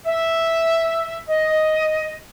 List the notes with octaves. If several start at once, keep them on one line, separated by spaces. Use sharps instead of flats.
E5
D#5